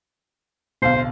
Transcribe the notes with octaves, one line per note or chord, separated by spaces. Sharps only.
D1 B1 C5 F5